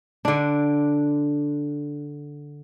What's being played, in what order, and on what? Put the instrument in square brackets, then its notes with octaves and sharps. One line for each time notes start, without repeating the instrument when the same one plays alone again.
[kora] D3 D4